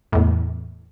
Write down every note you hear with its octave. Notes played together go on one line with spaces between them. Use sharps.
E2 A2